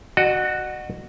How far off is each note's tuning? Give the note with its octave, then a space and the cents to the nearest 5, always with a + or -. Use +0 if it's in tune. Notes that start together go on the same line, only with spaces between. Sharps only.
F#4 +0 D#5 -40